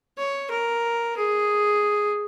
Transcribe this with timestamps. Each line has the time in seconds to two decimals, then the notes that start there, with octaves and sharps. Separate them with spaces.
0.18 C#5
0.50 A#4
1.17 G#4